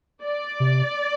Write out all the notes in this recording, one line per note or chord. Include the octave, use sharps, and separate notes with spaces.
D5
C3